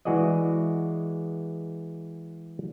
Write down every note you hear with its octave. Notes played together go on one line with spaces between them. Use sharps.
E3 G#3 F#4 G#4 D5 D#5